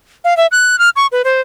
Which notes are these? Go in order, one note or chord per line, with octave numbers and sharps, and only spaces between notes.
F5
E5
F#6
F6
C#6
B4
C5